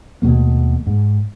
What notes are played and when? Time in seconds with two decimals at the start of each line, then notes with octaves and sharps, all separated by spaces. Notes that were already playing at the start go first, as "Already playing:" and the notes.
0.22 D#2 B2 A3 A#3
0.87 G#2